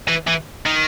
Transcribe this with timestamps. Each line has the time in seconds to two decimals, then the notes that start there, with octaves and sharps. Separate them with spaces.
0.08 E3
0.27 E3
0.66 D#3